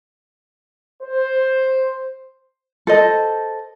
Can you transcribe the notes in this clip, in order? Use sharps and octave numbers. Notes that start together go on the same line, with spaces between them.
C5
A4 C5 D#5